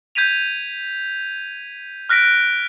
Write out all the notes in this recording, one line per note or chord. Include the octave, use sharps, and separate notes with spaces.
G6 G#6 B6 D#7 F7
F6 F#6 A#6 B6 D7